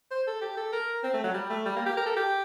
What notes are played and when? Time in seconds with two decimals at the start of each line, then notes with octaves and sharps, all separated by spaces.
0.11 C5
0.27 A4
0.41 G4
0.57 A4
0.72 A#4
1.03 C4
1.13 A3
1.24 F#3
1.34 G3
1.50 A3
1.65 G3
1.76 A#3
1.86 G4
1.97 A#4
2.06 A4
2.16 G4